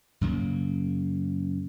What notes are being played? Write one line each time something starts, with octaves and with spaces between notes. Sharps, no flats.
F#2 C#3 A#3